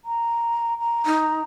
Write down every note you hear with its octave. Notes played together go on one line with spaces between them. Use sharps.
A#5
A#5
D#4